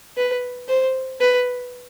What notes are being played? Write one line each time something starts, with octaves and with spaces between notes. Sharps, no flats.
B4
C5
B4